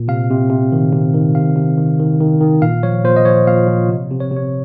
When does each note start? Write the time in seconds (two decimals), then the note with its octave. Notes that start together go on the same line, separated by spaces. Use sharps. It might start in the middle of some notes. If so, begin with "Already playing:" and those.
Already playing: A#2
0.08 C3 F5
0.30 C3
0.50 C3
0.72 D#3
0.93 C3
1.14 D#3
1.35 C3 F5
1.56 C3
1.77 D#3
1.99 D#3
2.20 D#3
2.41 D#3
2.62 A#2 F5
2.83 F3 C#5
3.04 A#2 C5
3.16 D#5
3.25 F3 C#5
3.47 A#2 F5
3.68 F3
3.89 C3
4.11 C3
4.20 C#5
4.31 C3
4.37 C#5